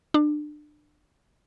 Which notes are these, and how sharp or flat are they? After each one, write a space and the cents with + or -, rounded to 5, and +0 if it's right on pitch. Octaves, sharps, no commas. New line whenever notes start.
D4 +30